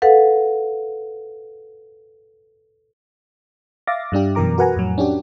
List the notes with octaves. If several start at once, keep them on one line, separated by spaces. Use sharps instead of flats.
A4 B4 F5 F#5
E5 F5 D6 A6 A#6
G2 G3 D4 G4
F#2 B2 E3 A#4 A#5 D6
F#4 A#4 B4 F#5 G#5 A#5
F2 A2 F#3
C#4 D4 F#4 G4